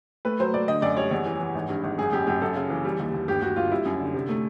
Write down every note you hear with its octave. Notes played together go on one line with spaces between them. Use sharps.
A3 B4
F#3 C5
A3 D5
D3 D#5
F#2 D5
G3 C#5
E2 C#5
E3
E3
G#1
G2
G#1
F#2 G#4
F#2 G4
F#2 G4
F#2 A4
C#3
E3
G3
D#2
D#2
G1 G4
G1 F#4
G1 F4
G3 E4
F#2
D3
C3
A3